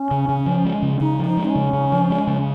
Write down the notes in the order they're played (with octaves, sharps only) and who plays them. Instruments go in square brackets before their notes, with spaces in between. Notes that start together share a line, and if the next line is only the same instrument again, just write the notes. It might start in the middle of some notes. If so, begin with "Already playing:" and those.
Already playing: [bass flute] C#4
[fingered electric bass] C#3
C#3
F3
G#3
C#3
[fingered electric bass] C#3 [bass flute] D#4
[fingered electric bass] F3
[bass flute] D#4
[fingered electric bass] G#3
[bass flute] C4
C#4
[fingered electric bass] C#3
C#3
F3
G#3
C#3